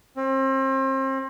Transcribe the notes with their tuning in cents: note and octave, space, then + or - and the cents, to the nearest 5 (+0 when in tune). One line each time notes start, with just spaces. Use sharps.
C4 +35